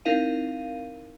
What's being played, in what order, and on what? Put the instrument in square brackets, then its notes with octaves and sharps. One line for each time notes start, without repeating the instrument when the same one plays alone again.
[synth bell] C4 D#4 E4 A#4 F5 D#7